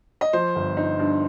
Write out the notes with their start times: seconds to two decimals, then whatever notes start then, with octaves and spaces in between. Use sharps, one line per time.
0.21 D#5
0.33 F3 C5
0.56 G1
0.77 D#4
0.99 G2